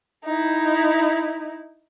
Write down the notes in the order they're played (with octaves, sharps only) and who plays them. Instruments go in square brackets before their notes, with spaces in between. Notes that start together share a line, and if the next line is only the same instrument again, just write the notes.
[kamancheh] D#4 E4